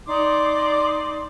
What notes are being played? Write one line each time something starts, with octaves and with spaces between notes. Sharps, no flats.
D#4 D5 C6 D6